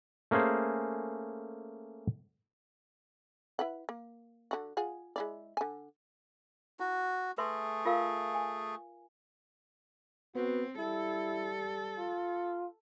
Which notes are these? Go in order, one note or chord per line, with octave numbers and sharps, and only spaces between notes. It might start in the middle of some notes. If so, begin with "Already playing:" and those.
A3 A#3 C#4 G#4 C5
E4 B4 F#5
A#3
D3 F#4
F4 G#4 F#5
G#3 E4 D5
D3 G#5
E4 F#4
A3 G#4 B4 E5 C6
F4 A#4 F5
G#5
B3 C4 F#4
G3 E4 A4
F4